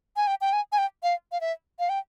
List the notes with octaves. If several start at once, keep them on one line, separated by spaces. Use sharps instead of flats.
G#5
G5
G5
G#5
G#5
G5
F5
F5
E5
F5
G5